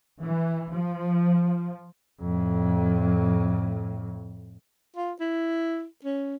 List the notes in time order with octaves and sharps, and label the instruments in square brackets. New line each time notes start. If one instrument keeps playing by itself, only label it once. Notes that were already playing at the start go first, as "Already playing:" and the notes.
[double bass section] E3
F3
[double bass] F2 A2
[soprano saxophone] F4
E4
C#4